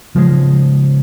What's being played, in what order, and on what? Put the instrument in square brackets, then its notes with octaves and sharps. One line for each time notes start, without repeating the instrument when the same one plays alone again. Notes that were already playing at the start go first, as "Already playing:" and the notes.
[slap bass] C#3 F3 G#3